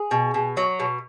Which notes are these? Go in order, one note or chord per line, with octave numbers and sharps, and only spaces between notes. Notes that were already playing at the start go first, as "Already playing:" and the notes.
Already playing: G#4
B2
B2
F#3
B2